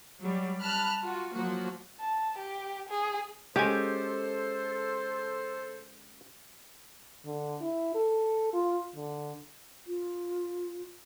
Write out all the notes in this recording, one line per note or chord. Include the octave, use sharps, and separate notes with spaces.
F#3 G3
A5 B5 F6 F#6
F4 F#4
F3 F#3 A#3 F#4
A5
G4
G#4
G#3 C#4 G4 A4 C5 G#5
D3
E4
A4
F4
D3
F4